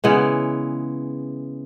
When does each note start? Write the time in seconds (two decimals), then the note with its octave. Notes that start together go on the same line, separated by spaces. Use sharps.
0.04 C#3 E3 G#3 B3